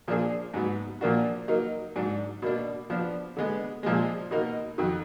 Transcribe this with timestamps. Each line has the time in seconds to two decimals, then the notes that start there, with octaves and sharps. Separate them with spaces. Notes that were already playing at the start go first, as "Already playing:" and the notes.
0.08 A#2 F3 A#3 D4 G#4
0.54 G#2 F#3 B3
1.01 A#2 F3 A#3 D4 F#4
1.48 F#3 A#3 D#4 A#4
1.96 G#2 F#3 D4
2.42 B2 A#3 D4
2.90 F3 B3 D4
3.37 D3 G#3 B3
3.83 A#2 F3 G#3
4.31 B2 A#3 D#4 F#4 A#4
4.78 F2 D#3 F#3